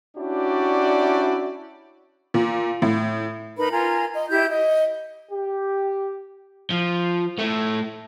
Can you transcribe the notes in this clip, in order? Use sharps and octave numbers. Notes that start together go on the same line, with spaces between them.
C#4 D4 E4 F#4 G4 D5
A#2
A2
D#4 A#4 B4 B5
F4 A#4 G#5 A#5
D#5
E4 G4 E5 G6
D#5
G4
F3
A2 A3